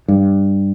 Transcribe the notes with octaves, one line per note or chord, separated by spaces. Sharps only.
G2